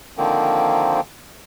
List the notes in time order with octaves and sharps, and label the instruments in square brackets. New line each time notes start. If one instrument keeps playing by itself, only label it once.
[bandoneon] D3 D#3 F3 A#3 C4